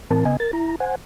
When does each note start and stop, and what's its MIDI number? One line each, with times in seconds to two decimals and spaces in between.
0.10 0.24 45
0.10 0.24 52
0.10 0.24 60
0.10 0.24 70
0.10 0.24 81
0.25 0.37 49
0.25 0.37 59
0.25 0.37 75
0.25 0.37 80
0.40 0.51 70
0.40 0.51 93
0.53 0.76 64
0.53 0.76 82
0.80 0.95 72
0.80 0.95 78
0.80 0.95 80